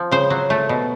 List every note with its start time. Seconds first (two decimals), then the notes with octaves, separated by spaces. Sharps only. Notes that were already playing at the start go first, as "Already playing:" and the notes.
Already playing: F3
0.11 C#3 C5
0.30 F#3
0.50 A3
0.69 B2